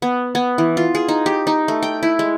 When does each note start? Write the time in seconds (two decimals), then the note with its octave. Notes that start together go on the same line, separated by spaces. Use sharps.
0.02 B3
0.35 B3
0.58 E3
0.77 F4
0.95 G#4
1.09 D#4
1.26 G4
1.47 D#4
1.68 A3
1.83 G5
2.03 E4
2.19 G#3